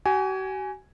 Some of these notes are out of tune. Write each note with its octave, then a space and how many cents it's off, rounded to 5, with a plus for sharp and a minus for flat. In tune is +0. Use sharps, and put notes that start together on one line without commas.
F#4 +45 G#5 +0